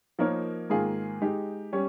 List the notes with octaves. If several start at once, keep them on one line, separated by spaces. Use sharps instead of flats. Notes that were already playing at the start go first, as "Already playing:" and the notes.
F3 A#3 D#4 A#4 C#5
G#2 D#3 A#3 F4 G#4
G#3 D#4 G4
G3 C#4 G4 C#5